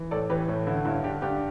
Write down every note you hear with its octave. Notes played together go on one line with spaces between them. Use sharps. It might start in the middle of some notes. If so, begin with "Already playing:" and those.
Already playing: E3
A2 A4 D5
E3 G4 B4
A2
D3 E4
G2 E4
D3 D4 G4
G2 D4 G4